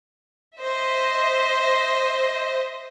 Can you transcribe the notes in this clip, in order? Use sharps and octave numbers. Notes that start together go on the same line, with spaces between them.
C5 D#5 E5